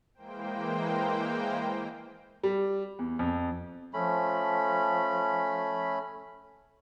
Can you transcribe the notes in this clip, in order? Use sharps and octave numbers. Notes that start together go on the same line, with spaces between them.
E3 G#3 A#3 C5 G5
G3
E2
F2
F3 A3 C#4 B5